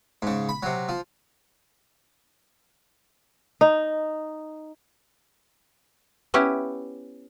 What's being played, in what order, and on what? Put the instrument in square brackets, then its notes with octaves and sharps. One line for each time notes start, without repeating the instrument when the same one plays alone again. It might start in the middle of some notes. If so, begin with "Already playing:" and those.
[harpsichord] G#2 C#3
B5
C3 F#3
F3
[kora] D#4
[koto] B3 C#4 E4 G4 B4